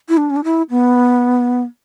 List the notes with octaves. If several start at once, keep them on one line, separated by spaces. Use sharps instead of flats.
E4
D4
C#4
D4
E4
B3